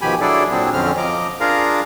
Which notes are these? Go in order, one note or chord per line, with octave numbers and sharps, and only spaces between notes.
B2 D#3 F3 G4 G#5 B5
F#3 D4 E4 G#4 A4 D5
A#2 F#3 C4 D4 G#4
F2 D3 C4 C#4 F6
F3 D#5 A#5 D6
D4 F4 G#4 A#4 F5 A#5